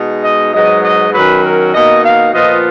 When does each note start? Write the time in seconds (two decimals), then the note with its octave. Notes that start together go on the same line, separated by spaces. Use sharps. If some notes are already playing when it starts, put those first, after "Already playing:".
Already playing: B2 G#3 D#4
0.24 D#5
0.54 G#2 F#3 B3 D#5
0.84 D#5
1.13 F#2 D#3 F#3 B4
1.44 A#4
1.74 B2 A#3 D#4 D#5
2.04 F5
2.34 A#2 F3 B3 F4 D#5